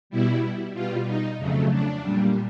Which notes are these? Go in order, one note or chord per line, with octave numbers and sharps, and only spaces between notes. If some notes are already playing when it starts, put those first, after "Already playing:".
B2 G3 E4
B2 G3 F4
D#4
F2 C#3 F#3 A3
D4
A#2 G3